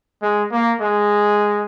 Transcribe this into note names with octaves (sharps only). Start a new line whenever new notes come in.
G#3
A#3
G#3